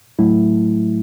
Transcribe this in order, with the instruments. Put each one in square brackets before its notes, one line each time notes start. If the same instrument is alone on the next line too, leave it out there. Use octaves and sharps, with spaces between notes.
[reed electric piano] A2 F#3 A3 E4